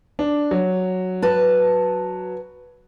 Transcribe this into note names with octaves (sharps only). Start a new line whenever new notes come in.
D4
F#3
B4 A5